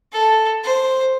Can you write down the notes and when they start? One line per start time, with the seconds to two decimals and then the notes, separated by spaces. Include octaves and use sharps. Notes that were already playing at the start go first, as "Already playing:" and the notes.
0.13 A4
0.64 C5